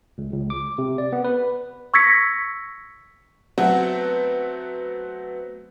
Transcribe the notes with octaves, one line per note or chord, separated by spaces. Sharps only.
C#2
C#2
D6
C3
D5
B3
B4
C#6 E6 G#6 A#6 B6 C#7
F#3 A3 B3 C4 F#4